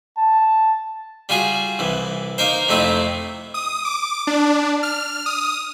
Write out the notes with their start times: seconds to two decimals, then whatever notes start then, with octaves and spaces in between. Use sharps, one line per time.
0.18 A5
1.29 G3 F4 F#4 G#4 G#5
1.79 C2 E3
2.38 A#3 D#4 A#4 C5
2.68 F2 C3 A3 C4 D#4 E4
3.54 D#6
3.85 D6
4.27 D4
4.83 F6
5.26 D#6